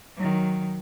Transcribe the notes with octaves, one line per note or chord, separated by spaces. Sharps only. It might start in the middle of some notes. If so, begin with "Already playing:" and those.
D#3 F#3